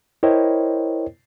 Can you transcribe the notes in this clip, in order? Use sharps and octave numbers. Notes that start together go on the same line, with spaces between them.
E4 A#4 C5 C#5 D#5 G5